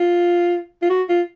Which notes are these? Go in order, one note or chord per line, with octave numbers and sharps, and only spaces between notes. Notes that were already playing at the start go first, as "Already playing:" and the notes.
Already playing: F4
F4
F#4
F4